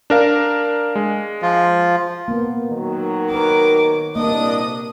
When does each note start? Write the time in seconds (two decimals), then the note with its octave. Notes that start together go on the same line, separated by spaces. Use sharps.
0.10 D4 A#4 F5
0.95 G#3
1.42 F3 F4
2.28 A#3 B3
2.70 D#3 F#3
3.30 D#4 A#4 B4 D6
4.16 C2 A#3 D4 D#5 D#6